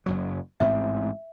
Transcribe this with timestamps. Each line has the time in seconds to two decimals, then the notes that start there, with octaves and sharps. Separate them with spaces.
0.06 F#1 F#2 F#3
0.60 A1 G#2 C4 E5